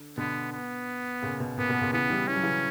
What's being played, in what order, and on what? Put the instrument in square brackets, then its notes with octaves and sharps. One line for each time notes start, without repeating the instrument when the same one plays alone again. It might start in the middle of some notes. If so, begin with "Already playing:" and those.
Already playing: [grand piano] D3
[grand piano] B2 D3 [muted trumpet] B3
[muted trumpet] B3
[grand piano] A#2 C#3
B2
[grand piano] A#2 [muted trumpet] B3
[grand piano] B2
A#2 C#3
[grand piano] C#3 E3 [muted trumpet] B3
[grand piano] E3 G3
[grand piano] E3 [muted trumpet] C#4
[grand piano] F#3
C#3 E3